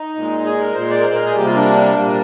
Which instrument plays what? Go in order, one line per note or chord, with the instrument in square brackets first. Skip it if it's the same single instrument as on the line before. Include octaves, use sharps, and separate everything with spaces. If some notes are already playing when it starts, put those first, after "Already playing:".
Already playing: [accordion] D#4
A#2 G#3
G#4
A#4
A#2 G#3 C5
D5
A#4
C5
A#4
G#4
C3 G3 A#3 G4
F4
D4
A#2 G3 A#3